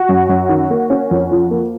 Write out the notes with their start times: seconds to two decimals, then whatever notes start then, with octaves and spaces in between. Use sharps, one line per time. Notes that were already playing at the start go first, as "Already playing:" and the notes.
Already playing: F#4
0.09 F#2
0.29 F#2
0.49 D#3
0.70 A#3
0.90 C#4
1.11 F2
1.31 F3
1.51 A#3